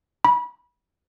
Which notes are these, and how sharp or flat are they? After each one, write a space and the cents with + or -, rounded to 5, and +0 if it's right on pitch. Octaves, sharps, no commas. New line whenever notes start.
B5 -25